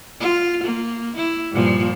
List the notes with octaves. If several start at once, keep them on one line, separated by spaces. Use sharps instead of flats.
F4
A#3
E4
G2 A#2 F3